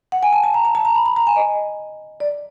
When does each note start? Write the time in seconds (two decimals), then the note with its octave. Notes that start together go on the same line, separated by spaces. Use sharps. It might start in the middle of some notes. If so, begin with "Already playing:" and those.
0.12 F#5
0.23 G#5
0.33 A5
0.44 A5
0.54 A#5
0.65 A5
0.75 A5
0.85 A#5
0.95 B5
1.06 B5
1.16 A#5
1.27 G#5
1.36 D#5
2.20 D5